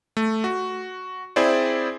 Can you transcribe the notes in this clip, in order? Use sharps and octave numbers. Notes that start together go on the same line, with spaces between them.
A3
F#4
C4 E4 G#4 C5 D5